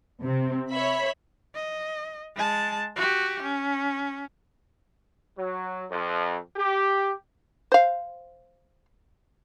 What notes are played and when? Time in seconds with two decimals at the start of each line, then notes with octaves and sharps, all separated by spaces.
0.22 C3 C4
0.70 C#5 E5 B5
1.55 D#5
2.36 G#3 A5
2.96 F#4 G4
3.43 C#4
5.36 F#3
5.90 F2
6.55 G4
7.72 C5 F5